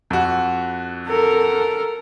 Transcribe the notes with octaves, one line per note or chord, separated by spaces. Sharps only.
F2 F#4
A4 A#4